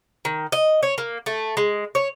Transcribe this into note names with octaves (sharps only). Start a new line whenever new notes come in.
D#3
D#5
C#5
A#3
A3
G#3
C#5